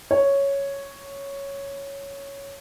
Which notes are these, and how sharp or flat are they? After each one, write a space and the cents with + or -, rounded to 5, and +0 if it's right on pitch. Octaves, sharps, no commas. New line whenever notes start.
C#5 +0